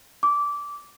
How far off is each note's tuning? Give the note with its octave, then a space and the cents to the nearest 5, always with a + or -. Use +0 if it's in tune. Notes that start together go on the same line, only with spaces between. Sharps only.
D6 -15